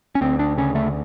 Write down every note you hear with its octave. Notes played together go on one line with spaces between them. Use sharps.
C#4
D2 C4
D4
C#3 C#4
A3